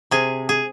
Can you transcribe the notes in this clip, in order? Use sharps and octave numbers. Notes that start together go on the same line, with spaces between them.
C3 G#4
G#4